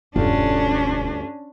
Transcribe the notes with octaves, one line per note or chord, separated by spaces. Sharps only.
E1 D2 G2 C#4 D4 F4